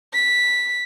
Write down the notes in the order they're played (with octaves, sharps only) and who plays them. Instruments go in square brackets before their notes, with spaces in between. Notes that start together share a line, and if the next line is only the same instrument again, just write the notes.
[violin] B6